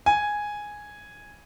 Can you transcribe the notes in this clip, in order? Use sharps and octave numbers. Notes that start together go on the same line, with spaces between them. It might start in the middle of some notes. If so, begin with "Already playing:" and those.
G#5